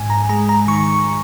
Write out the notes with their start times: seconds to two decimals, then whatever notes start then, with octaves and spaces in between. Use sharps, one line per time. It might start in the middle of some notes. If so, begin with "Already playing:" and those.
Already playing: G#2 G#5
0.10 A#5
0.29 G#3 A#5
0.49 A#5
0.67 D#3 C#6